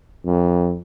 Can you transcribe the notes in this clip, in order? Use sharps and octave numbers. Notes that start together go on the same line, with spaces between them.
F2